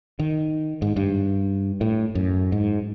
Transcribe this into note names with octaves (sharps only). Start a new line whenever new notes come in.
D#3
G#2
G2
A2
F#2
G#2